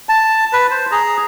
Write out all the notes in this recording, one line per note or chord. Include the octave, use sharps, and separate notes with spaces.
A5
B4
C5
G#4 A#5